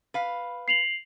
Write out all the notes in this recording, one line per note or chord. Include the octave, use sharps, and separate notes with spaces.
B4 F5
C7 F7 F#7